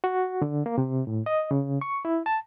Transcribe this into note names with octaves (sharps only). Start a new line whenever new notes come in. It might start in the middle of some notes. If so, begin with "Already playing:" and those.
F#4
D3
A#3
C3
A2
D#5
C#3
C#6
E4
A5